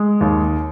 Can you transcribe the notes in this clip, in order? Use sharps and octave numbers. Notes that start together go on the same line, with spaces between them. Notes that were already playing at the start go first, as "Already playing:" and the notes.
Already playing: G#3
D#2